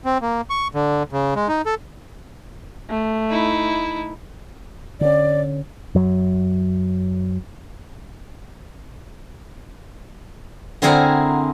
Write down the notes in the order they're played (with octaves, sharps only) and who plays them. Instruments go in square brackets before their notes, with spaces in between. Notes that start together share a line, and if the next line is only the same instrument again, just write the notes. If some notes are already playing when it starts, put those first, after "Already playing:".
[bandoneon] C4
A#3
C#6
D3
C#3
G#3
D#4
A4
[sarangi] A3
[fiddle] D#4 E4
[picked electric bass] D3 C#4 [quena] D5
[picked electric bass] F#2 F#3
[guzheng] D3 C4 E4 G#4 A#4 F#5